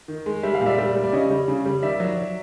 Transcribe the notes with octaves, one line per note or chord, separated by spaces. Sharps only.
D#3
G#3
G3 E5
F5
A#2
D5 E5
G3
G3
D5
C#3 C#5 D#5
G3
C#3
G3
D#3 D5 E5
F#3
F#3